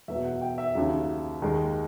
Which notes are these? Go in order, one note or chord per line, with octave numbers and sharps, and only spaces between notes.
E2 B2 F#3 E5
F#5
G5
E5
D#2 C#3 F#3
D#2 D#3 G#3